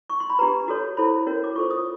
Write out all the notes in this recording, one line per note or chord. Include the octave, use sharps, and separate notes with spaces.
C#6
C6
B5
D4 G4 B4 A#5
F#4 A4 C#5
E4 A4 C5 B5
C#4 F#4 A#4 C#5
D6
F4 A4 C5 C#6
D#6